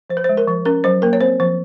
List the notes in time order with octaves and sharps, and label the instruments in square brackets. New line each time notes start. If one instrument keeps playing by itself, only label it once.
[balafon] F3 C5
B4
C5
G#3
A#4
F3
C#4 A#4
F#3 C5
A#3 A#4
C#5
C4 C5
F3 C5